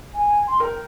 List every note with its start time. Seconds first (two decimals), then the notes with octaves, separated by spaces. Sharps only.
0.14 G#5
0.47 C6
0.60 A#4 G5